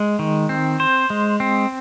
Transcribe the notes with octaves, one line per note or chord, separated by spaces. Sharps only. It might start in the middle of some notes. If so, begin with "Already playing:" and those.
Already playing: G#3
D#3
C4
C5
G#3
C4